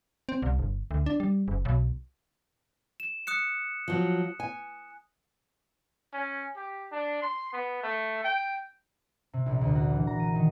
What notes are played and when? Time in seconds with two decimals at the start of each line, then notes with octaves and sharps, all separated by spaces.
0.29 C4
0.42 C2
0.59 G1
0.91 D2
1.06 D4
1.20 G3
1.48 F#1
1.65 B1
3.00 E7
3.27 D#6 F#6 C#7
3.88 F3 F#3
4.40 G#5
6.13 C#4
6.57 G4
6.92 D4
7.22 C6
7.53 B3
7.83 A3
8.24 G5
9.33 C3
9.46 A#1
9.61 D2
9.75 F#4
9.90 E3
10.07 A#5
10.20 D#7
10.35 D#3